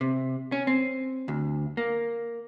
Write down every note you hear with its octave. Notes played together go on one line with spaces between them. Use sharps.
C3
C#4
C4
D2
A#3